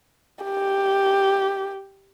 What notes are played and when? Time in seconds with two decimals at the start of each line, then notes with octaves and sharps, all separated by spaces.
0.45 G4